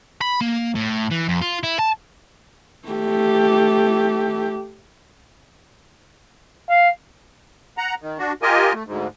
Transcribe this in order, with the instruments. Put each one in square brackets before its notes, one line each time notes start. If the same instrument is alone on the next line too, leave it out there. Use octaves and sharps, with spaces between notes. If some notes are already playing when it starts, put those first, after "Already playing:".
[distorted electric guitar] B5
A#3
A2
E3
F2
F4
E4
A5
[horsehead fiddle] A3 G4
[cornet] F5
[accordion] F#5 A#5
D#3
D4 F#4
F4 G4 A#4 D#5 G#5
A3
D2 G#2